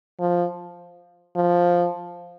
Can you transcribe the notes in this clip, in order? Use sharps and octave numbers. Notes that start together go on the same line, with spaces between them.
F3
F3